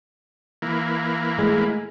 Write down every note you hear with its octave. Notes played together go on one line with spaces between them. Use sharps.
E3 A#3
A2 G#3